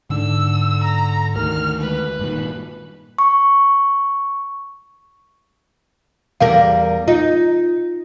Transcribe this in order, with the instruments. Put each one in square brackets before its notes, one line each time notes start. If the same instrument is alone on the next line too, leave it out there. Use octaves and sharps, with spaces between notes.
[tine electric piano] G#2 [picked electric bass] D3 D4 [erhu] E6
[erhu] A#5
[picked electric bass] D2 D#3 [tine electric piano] A#4 [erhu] F6
[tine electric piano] G#3 [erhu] B4
[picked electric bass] G2 A#2 D#3
[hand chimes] C#6
[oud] E2 G3 A#4 [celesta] F5
[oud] D#4 [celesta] F4